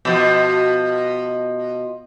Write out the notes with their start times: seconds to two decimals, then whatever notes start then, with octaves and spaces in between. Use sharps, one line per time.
0.05 B2 F3